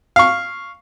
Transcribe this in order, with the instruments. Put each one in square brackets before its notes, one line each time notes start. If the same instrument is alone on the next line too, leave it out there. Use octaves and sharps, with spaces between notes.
[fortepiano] F5 C#6